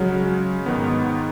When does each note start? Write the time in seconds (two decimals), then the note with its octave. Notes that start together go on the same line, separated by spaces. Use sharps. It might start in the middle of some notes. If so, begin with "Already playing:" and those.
Already playing: C#3 F#3 G#3 C#4
0.66 G#2 D#3 B3